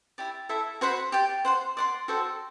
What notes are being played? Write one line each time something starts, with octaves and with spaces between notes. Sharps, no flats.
E4 G4 D5
E4 A4 E5
F#4 C5 F#5 B5
G4 D5 G5
C5 F#5 C6
D5 F#5 C6
F#4 A4 C5 G5